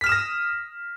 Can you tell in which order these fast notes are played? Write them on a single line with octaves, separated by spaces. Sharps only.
B6 F6 E7 D#6 A#6